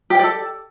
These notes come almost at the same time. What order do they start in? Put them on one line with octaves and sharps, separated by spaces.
G4 G5 D5 A4